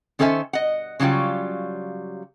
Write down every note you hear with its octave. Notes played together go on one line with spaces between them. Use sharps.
D#3 C#4 A4 C5 E5 G#5
D#5 F#5
C#3 F#3 G3 F4 G5